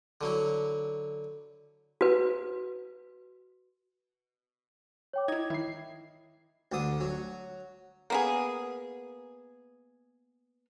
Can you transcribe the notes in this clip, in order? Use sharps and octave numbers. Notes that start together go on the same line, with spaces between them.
D3 F#3 E4
F#4 B4
C#5 G5 D6
D#4 E4 D#5 G#6
D#3 E4 C7
D2 D3 D#6
F#3
A#3 B3 G#4